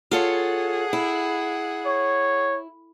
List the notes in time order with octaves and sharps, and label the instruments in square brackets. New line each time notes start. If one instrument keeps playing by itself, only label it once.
[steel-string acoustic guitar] F4 A4 C#5 [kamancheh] G#4 F#5
[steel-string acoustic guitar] E4
[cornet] C#5